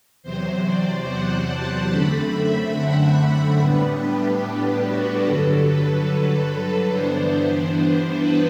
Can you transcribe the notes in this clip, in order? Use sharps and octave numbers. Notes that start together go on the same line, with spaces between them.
E2 C3 F#3 C5
D5
F#5
A5
F#2 D3 A3 C4 B5
E5
F#5
E5
A2 G3 B3 D4 B4
G4
F#4
G2 D3 F#3 A4
B4
G2 E3 B3 D4 C5
B4